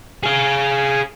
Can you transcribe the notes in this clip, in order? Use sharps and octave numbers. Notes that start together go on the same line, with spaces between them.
G#4 F5